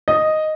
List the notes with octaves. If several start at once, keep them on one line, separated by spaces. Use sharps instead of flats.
D#5